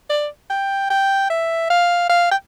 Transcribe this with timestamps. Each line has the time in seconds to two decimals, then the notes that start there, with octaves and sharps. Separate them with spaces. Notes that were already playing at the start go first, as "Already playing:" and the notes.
0.09 D5
0.50 G5
0.90 G5
1.30 E5
1.70 F5
2.09 F5
2.31 G5